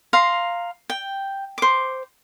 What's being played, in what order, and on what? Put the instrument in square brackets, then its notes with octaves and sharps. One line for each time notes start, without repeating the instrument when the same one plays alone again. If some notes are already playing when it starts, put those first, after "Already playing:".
[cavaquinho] F5 A#5 C6
G5
C5 D6